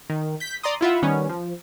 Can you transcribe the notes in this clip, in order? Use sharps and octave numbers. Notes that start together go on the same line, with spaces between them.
D#3
G6 B6
D5 A#5 C6 D#6
E4 F4 E5 F#5
D#3 G3 B3 C#4
F3